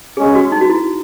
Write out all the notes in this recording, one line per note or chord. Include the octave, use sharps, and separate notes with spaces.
B2 G#3 C#4 G#4
F#4
D#4
F#4
E4